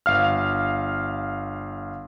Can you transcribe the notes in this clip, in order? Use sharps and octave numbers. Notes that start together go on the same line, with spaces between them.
G1 F5 F6